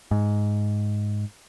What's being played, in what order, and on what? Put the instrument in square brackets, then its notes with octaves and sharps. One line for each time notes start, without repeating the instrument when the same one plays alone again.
[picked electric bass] G#2